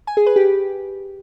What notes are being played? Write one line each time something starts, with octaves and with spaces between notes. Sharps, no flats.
G#5
G#4
B4
G4